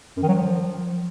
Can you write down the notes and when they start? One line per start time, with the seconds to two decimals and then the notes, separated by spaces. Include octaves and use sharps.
0.16 F#2
0.22 D#3
0.28 F#3
0.34 F3